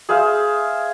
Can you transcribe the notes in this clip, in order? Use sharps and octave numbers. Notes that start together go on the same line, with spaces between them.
G#4 C5 E5 F5